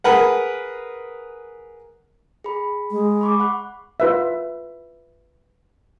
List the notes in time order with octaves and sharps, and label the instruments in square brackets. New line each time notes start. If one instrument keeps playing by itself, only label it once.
[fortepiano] G#4 A#4 B4 F#5
[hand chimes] G#4 B5
[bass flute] G#3
[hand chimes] B5 C#6 D6
F#5 B5 F#6
[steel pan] F4 B4 E5